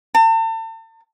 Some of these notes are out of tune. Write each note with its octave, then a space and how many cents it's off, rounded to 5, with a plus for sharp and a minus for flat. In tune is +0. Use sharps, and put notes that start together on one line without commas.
A5 +40